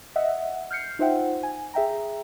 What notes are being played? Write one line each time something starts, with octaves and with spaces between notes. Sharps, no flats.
D#5 E5 F#5
F6 G6 C7 C#7
D#4 F4 C5 E5 F#5 G5
G#5
G#4 E5 G5 A#5